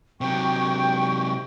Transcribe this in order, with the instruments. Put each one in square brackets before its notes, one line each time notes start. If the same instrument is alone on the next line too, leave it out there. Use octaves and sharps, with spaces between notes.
[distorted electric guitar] C3 F#3 [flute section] G5 C#6